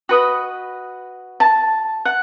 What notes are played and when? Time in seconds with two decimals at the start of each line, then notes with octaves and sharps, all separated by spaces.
0.09 F#4 B4 D#5
1.40 A5
2.05 F#5